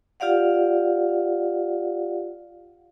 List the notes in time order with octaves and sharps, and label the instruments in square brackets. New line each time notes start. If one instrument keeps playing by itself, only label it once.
[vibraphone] F4 G4 D5 F5 F#5